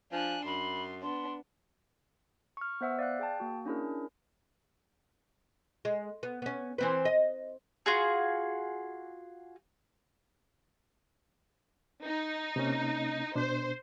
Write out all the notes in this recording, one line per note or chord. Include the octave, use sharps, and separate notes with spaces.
F3 D4 G#5 F#6
F#2 B5 C6
B3 D4 C6
C#6 F6
B3 C5 E5 F#5 E6
D5 F5 F#6
G#4 G5 A5
A#3 F#4
C#4 D4 E4 G#4 A#4
G#3
B3
B3 C#4
E3 C4 B4
D#5
F4 F#4 G#4
D#4
C3 A#3 C#4
B2 B3 D4 C5